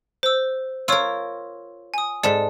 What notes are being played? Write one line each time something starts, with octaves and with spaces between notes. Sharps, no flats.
C5 E6
F4 A#4 C#5 C#6 E6
G#5 D#6
G#2 A4 D5